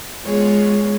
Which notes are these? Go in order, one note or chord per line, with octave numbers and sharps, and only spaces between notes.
G#3 B3 F4 G#4 C#5